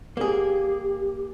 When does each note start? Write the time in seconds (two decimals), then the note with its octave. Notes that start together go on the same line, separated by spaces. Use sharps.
0.17 A#3 G4 G#4